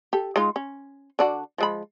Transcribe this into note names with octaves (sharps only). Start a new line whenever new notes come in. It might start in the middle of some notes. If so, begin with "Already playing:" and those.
G4 A4
G#3 D#4 F4
C#4
D3 D4 F#4
F3 G#3 B5